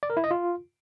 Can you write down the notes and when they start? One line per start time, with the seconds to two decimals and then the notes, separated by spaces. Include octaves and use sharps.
0.03 D5
0.10 A#4
0.17 E4
0.24 D#5
0.31 F4